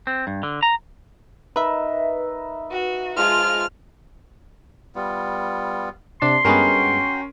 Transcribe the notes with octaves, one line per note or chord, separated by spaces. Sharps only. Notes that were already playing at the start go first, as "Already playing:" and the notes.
C4
G2
D3
A#5
D#4 A#4 B4 E5
F#4
F3 G#3 F4 C5 F6
G3 B3 F4
C3 D4 A5 C6
G2 G#3 B3 C#4 F#4 A#4 G5